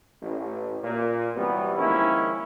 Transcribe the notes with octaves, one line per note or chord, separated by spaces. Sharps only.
A1
A#2
C3 E3 F#3 G3 B3
D#3 F3 G#3 A#3 C#4 E4